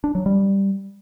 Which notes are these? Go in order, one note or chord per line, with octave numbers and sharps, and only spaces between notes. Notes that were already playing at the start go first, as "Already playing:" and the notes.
D4
F#3
G3